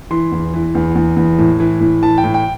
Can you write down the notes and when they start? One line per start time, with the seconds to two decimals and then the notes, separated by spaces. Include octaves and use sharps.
0.11 E3 C6
0.32 E2
0.54 E3
0.75 E2
0.95 E2
1.17 E2
1.38 A2
1.60 E3
1.80 A2
2.02 E3 A5
2.18 G5
2.24 A2
2.34 G5